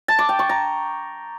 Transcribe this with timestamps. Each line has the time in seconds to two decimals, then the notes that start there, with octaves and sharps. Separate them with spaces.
0.08 A5
0.19 D6
0.29 G5
0.39 C#6
0.49 A#5